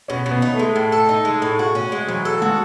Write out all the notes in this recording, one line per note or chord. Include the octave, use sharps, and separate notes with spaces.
B2 C#4
B2
B3
D#4
A3
G#3
A2
A4
D#4
G#3
A2
F#4
C#4
G#3
E3 F#3
A4
G#3 F#4